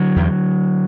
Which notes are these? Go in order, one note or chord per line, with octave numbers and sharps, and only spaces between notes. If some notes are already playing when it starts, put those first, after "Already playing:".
Already playing: D3 F#3
E2